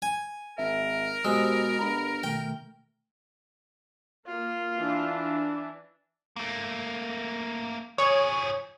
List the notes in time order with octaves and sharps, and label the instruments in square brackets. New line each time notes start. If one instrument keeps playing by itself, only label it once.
[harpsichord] G#5
[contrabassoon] G#1 [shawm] A#4 [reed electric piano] E5
[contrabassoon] B2 [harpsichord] G#3 [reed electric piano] G4 C5 E6
[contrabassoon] G1 [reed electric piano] A#5 B5
[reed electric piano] B2 D#3 A3 [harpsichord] G5
[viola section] A#3 [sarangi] F4
[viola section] E3 D4
[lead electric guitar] A3 A#3
[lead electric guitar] F3 G#4 [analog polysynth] C#5